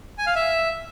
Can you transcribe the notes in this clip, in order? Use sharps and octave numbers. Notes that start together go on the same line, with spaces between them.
G#5
F5
E5